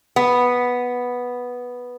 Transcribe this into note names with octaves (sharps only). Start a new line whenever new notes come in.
B3